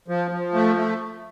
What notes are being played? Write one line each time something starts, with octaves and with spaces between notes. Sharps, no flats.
F3
F3
A3
A3